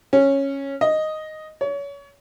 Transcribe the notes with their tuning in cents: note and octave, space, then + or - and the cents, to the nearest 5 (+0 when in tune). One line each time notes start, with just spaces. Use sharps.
C#4 -10
D#5 +0
C#5 +30